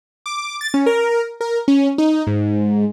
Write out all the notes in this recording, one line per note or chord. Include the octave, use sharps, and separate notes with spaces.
D6
A6
C#4
A#4
A#4
C#4
D#4
G#2